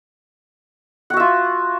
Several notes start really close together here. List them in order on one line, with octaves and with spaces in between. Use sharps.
F#5 F#4 E5 F4